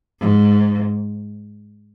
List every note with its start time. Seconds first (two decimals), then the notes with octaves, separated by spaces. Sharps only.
0.20 G#2